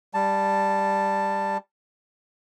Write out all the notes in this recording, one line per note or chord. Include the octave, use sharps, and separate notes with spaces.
G3 A5